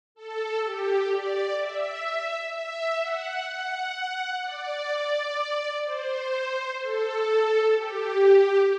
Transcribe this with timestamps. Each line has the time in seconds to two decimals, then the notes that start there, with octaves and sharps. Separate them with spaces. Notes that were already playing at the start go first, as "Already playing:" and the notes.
0.15 A4
0.63 G4
1.11 D5
1.57 E5
2.53 E5
2.99 F#5
3.47 F#5
4.41 D5
5.83 C5
6.78 A4
7.73 G4